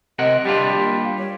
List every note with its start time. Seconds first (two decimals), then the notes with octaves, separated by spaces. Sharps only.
0.19 C3 A#4 D#5 F#5
0.45 G3 D4 F4 G4
0.75 A#3
1.18 C#5